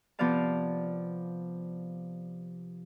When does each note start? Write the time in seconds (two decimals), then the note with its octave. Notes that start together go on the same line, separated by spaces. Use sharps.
0.19 C3 F3 B3 D5 F5 A5